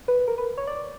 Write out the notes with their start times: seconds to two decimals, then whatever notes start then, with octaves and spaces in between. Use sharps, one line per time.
0.08 B4
0.28 A#4
0.38 B4
0.58 C#5
0.67 D5